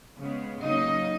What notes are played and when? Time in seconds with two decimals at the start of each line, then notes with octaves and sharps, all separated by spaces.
0.20 C#3 G#3 B3
0.61 C#3 F#3 A#3 C#4 D#4 D#5